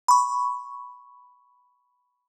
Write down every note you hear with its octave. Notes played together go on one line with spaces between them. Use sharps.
B5 C#6